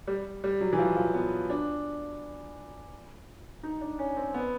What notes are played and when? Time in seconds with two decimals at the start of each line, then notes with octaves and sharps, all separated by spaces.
0.07 G3
0.44 G3
0.61 F#3
0.73 E3
0.79 F3
0.97 F3
1.14 B3
1.50 D4
3.63 D#4
3.81 D4
3.99 C#4
4.17 C4
4.34 B3